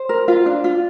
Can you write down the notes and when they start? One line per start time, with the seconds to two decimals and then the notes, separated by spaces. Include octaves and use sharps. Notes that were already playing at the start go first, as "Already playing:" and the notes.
Already playing: C5
0.09 A#4
0.28 F4
0.46 D4
0.64 F4